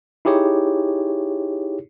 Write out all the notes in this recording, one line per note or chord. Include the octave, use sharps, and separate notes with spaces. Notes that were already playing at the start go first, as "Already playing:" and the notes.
D#4 E4 G4 G#4 C#5